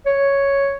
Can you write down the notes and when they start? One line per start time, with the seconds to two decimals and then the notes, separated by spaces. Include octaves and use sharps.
0.06 C#5